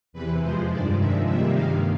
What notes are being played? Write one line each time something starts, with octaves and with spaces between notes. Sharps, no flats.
E2 C3 E3 B4
F2 C3 F3 G#3 C5
G2 D#3 G#3 D5
C3 F3 G#3 E5
C3 D#3 G3 A#3 E5
G2 D#3 G#3 F5